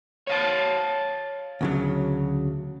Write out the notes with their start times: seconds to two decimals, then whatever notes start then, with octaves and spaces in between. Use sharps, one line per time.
0.27 C#5 F5 A5
1.61 D2 C#3 F#3